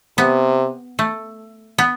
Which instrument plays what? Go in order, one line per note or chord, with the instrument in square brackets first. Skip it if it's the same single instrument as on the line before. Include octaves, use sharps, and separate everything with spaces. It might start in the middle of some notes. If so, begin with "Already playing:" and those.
[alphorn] C3 [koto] B3
[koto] A3
B3